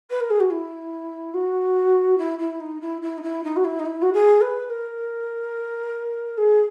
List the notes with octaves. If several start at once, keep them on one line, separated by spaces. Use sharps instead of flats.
B4
A#4
G#4
F#4
E4
F#4
E4
E4
D#4
E4
E4
D#4
E4
D#4
F#4
E4
D#4
E4
F#4
G#4
B4
A#4
G#4